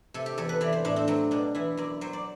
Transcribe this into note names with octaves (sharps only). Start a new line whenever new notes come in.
C3 A4
G4
E2 A4
B4
E3 D5
C5
A2 D4
C4
F#3 C4
B2 D4
E3 E4
F#2 D5
F#3 C5
D5